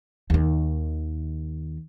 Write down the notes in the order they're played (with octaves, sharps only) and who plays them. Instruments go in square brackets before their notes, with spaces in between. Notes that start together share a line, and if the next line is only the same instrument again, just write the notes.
[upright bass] D#2 D#3